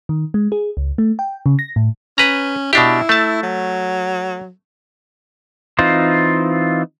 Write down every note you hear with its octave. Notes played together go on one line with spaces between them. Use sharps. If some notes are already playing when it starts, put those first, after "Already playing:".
D#3
G#3
G#4
C#2
A3
G5
C#3
A#6
A2
C#4 B4 A#5
B2 D4 E4 G4
A3 A5
F#3
E3 C4 D#4 F4 C5